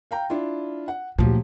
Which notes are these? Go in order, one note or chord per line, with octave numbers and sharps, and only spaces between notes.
F5 G5 A#5
D4 E4 F4
F#5
D2 A#2 F3 F#3 G4